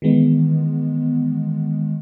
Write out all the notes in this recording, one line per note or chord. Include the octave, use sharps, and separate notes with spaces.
D#3 E3 G#3 B3